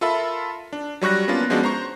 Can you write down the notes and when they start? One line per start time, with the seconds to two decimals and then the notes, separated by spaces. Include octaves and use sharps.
0.01 F4 A4 A#4 E5 B5
0.73 D4
1.01 F#3 G3 C#6 F#6 A#6
1.28 A#3 B3 C#4 D4 F4
1.50 F3 G#3 B3 C#4 D4 F#4
1.63 C5 A#5 C#6